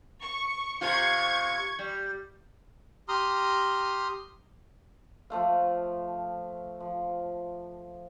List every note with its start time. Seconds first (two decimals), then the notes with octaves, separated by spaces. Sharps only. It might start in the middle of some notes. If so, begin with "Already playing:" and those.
0.21 C#6
0.81 C3 F4 C#6 G#6
1.79 G3
3.09 G4 A#5 C6 D#6 F6
5.30 F3 A3 F5
6.80 F3